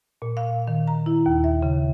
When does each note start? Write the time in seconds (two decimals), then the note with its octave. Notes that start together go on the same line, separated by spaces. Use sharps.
0.22 A#2
0.37 F5
0.68 D#3
0.88 A#5
1.06 E4
1.26 D#2
1.44 E5
1.63 C#3